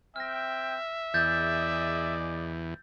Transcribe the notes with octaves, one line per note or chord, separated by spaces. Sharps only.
C4 E5 G5 F6 A#6
E2 G#4 D5 D#5 E6 G6 A6